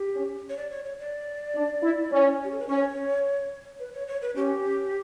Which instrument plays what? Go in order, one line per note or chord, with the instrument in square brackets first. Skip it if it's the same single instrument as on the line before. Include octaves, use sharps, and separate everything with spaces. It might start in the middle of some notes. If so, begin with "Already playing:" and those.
Already playing: [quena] G4
[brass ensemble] C#4
[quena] C#5
D5
C#5
C#5
D5
[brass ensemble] D4
E4
C#4
[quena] G4
A4
B4
[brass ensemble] C#4 [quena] C#5
[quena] B4
C#5
C#5
B4
[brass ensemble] C#4 [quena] G4